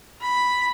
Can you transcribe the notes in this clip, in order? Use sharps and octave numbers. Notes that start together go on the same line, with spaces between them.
B5